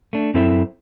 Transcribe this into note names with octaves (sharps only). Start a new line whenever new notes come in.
A3 D4
F#2 C4 E4 A4 C5 E5